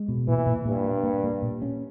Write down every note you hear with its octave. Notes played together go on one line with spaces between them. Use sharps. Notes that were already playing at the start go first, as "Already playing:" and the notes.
Already playing: G#3
B2
A#2 E3
A#2
G2 A#2
A#3
A#3
A#3
A#2
C#4